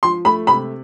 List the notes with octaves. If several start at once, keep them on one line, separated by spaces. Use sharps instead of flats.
F3 C6
A3 B5
C3 B5